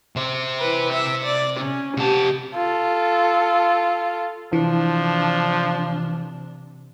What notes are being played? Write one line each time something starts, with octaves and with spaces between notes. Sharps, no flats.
C3 C5
E3 B4
E5
D5
C#4
C3 G4 A5
F4 A4
C3 E3 F3 D4